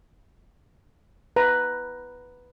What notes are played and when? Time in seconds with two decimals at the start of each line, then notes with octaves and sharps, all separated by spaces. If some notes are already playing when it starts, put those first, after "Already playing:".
1.36 B4 A#5